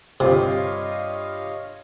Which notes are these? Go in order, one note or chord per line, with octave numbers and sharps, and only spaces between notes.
G2 C3 F4 G4 C#5 D#5 F5